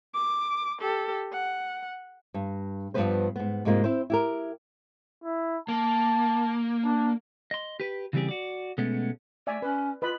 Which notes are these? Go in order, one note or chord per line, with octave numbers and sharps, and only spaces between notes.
D6
G4 A4
F#5
G2
G2 D#3 F3 B3 B4 C5
G#2 B3
G#2 C3 G#3 A#3 F4
C4 E4 C5
E4 G4 A#4
E4
A#3 A5
D4
D#5 C6
G4 B4
C#3 E3 G3 C4 G4 G#4
F#4 D5
B2 G#3 A3 B3 C#4
A3 D5 E5 G#5
C#4 B4
F4 B4 D#5 B5